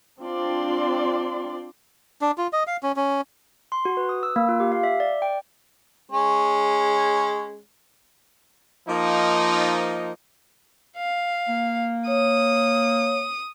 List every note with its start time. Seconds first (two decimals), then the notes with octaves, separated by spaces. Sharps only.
0.22 C4 D4 F4 D5 C6
2.21 D4
2.38 F4
2.53 D#5
2.67 F5
2.83 C#4
2.96 C#4
3.72 C6
3.85 F#4
3.97 B4
4.09 D#6
4.23 E6
4.36 A#3
4.49 F4
4.60 G4
4.72 F5
4.84 E5
5.00 D5
5.22 G5
6.12 G#3 C#4
8.88 F3 A#3 D#4
10.97 F5
11.49 A#3
12.07 C#5 D#6